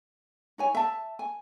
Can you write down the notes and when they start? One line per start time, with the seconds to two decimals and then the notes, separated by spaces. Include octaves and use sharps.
0.58 D#4 C#5 G#5
0.75 E5 A5
1.19 G#5